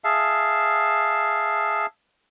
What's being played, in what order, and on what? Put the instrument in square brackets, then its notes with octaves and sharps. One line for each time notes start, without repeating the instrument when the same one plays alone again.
[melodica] G#4 E5 F5 A5